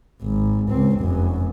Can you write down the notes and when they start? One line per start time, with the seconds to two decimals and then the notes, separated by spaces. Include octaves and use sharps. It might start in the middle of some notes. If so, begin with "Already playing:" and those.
0.22 G#1
0.69 C#2 C4
1.00 F1 F#2